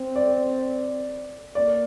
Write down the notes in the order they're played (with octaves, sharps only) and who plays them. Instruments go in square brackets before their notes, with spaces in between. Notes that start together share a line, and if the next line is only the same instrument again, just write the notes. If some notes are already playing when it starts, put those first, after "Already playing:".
Already playing: [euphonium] C4
[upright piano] D5
[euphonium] A#3 [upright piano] D5